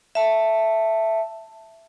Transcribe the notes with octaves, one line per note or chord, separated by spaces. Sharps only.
E5 A5